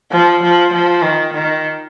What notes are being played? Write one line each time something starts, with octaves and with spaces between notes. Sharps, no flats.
F3
F3
F3
D#3
D#3